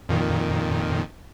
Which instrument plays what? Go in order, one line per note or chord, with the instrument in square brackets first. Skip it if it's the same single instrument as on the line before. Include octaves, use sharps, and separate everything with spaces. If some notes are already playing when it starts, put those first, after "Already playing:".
[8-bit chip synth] F2 A#2 D#3